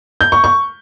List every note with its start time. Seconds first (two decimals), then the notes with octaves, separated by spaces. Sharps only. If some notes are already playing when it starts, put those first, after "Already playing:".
0.21 G6
0.32 C#6
0.44 C#6